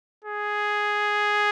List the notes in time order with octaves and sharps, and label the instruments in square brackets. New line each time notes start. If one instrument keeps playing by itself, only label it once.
[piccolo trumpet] G#4